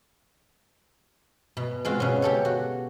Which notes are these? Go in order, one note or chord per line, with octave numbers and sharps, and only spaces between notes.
B2
G#3 C4 F4 F#4
B2 C#4
G4 A4 C#5
F#4